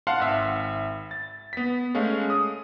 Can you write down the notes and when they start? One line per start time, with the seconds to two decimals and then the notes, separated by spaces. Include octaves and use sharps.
0.07 F5 F#5 A5 C6
0.20 G#1 E5
1.11 A6
1.53 B3 B6
1.95 G#3 A3 C#4 F5
2.30 D#6